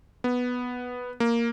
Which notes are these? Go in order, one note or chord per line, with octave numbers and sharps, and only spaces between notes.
B3
A#3